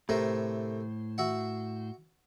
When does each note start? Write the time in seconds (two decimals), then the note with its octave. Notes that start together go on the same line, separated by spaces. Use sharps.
0.09 A2 C3 A3 A#4 C5
1.18 F#4 E5 F#5